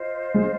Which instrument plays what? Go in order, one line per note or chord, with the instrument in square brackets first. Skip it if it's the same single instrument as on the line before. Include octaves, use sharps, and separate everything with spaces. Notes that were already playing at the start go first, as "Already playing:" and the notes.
Already playing: [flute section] F4 C5 D#5
[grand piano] G#3